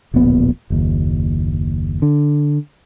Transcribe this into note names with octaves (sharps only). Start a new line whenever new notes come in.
D1 A#1 A#2 B3
F#1 D#2
D3